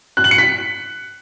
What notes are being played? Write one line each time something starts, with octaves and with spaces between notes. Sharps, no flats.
F#6
F#7
C#7
B6